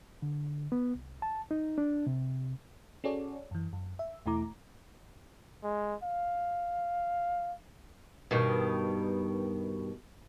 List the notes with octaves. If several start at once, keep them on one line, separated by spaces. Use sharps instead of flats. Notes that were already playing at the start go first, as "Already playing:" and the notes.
D3
B3
C2
A5
D#4
D4
C3
C#4 F#4 G#4 A4 C#5 D5
F#2 E3
F#2
E5
E2 B2 A3 E4 A#5 D6
G#3
F5
G2 B2 D#3